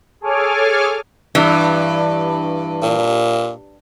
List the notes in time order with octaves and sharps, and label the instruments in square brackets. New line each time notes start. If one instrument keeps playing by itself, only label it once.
[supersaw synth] G#4 A4 C#5 G#5 D6 F6
[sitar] G2 [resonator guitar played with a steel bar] E3
[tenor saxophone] A#2